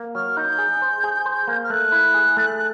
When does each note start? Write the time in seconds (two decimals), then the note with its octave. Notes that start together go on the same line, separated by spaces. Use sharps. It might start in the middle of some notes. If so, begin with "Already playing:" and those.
Already playing: A#3
0.15 F#3 F6
0.37 D#4 G6
0.58 G#4
0.82 C5
1.04 G#4
1.26 C5
1.48 A#3
1.64 F6
1.70 A3 F#6
1.92 E4
2.14 G#4
2.37 A3